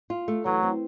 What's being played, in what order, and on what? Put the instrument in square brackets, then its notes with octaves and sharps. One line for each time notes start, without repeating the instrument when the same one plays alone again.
[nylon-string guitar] F4
A3
[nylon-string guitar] E3 [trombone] F#3
[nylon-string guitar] C4